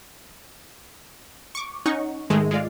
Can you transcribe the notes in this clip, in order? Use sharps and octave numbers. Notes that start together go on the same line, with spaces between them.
C#6 D6
C#4 D#4 F#5 C#6
G#2 D#3 G#3 A3
G#3 F4 D5 F5